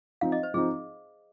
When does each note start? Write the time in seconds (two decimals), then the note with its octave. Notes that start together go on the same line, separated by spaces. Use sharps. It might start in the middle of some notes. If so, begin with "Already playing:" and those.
0.21 F3 C4 D#4 F5
0.32 D#5
0.43 C5
0.54 F3 C4 D#4 G#4